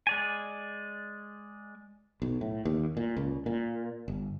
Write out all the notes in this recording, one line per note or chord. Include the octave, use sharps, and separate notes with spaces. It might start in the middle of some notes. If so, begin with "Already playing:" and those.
G#3 D5 G#5
B1
A2
D#2
A#2
C#2
A#2
G1